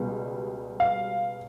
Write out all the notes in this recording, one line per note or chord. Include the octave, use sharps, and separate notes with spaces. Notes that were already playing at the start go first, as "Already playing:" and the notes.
Already playing: C#2 B2 G3
F5